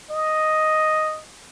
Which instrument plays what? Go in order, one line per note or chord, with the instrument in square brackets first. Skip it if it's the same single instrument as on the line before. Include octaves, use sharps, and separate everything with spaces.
[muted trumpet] D#5